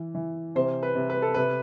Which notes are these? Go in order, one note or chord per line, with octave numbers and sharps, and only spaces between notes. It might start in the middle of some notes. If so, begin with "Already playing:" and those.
Already playing: E3
E3
C3 C5
B4
C3
B4
A4
C3 B4